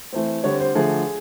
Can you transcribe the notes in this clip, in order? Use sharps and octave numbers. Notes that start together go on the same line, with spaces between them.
E3 A3 C4
D3 G3 C4 C#5
C5
D3 F3 A3 G#4